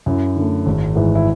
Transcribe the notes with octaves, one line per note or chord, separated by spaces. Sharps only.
F#2 E4
D3 A3
G#1
G#2 E3
E4